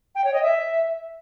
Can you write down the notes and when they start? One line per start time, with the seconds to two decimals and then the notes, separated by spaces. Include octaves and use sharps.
0.15 G5
0.24 C#5
0.33 D#5
0.42 E5